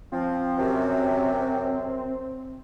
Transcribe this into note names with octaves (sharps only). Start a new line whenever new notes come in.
F3 C4
F#2 C3